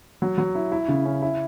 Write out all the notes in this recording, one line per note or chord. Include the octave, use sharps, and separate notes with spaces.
F#3
F#3
E4
E4
C#3
C#4
E4